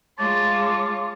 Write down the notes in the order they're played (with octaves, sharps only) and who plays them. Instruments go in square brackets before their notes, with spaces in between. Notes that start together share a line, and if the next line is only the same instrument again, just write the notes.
[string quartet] G#3 F4 C#5 [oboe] A5 [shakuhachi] D6